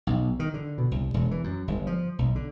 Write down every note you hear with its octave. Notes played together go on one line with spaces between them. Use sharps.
B1
D#3
D3
B2
C2
E1
E3
F#2
G1
F3
B1
D3